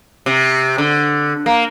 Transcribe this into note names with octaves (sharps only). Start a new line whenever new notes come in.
C3
D3
A#3